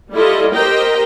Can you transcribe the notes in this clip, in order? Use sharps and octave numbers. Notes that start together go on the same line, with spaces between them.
G3 E4 F4 A4 D#5
G4 A#4 C5 D#5 G5 A#5